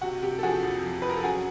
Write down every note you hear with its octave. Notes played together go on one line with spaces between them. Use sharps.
C3 F#4
C3 G4
A4
F3 F#4 G#4
F2
F3
F3 B4
A#4
A4
F#2 F#4 G#4